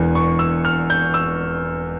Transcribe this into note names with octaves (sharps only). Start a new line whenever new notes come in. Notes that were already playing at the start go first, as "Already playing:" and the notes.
Already playing: E1 E2 E3
C#6
E6
F6
G6
E6